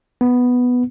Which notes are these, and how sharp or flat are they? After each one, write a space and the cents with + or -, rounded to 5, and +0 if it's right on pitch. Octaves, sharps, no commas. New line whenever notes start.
B3 +0